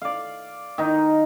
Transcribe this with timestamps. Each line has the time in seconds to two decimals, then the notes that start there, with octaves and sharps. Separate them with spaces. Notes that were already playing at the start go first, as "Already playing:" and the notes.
0.02 D5 F5
0.78 D#3 D#4